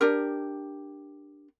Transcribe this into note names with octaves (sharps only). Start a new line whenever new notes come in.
D4 G4 A#4